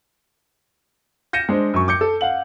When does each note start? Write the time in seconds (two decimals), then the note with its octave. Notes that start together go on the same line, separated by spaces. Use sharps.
1.33 G6 A#6 C#7 D#7 E7
1.49 G#3 D4 C5
1.74 F#2 C#6
1.88 D6 G6 C#7
2.01 A4
2.21 F5 F#5 F#7